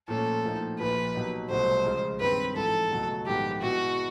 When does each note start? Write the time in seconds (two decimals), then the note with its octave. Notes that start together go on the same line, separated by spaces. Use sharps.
0.08 A#2 F3 A3 C#4 A4
0.44 A2 F3 A#3 D#4
0.79 A#1 A#2 F3 B4
1.14 B2 F#3 A#3 D#4 G4
1.50 C2 B2 F#3 A3 C5
1.85 C#2 C#3 F3 G#3
2.20 G2 D#3 G#3 C4 B4
2.56 A1 G#2 F3 A4
2.91 C#2 B2 F#3 A3
3.26 A#1 G#2 D#3 G#3 B3 G4
3.62 B2 G#3 B3 E4 F#4